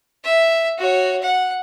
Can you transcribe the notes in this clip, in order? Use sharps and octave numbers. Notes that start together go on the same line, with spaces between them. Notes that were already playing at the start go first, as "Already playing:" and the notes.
E5
F#4 C#5
F#5